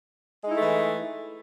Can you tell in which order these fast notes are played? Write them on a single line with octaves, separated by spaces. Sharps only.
G#3 D#4 E4 A3 E3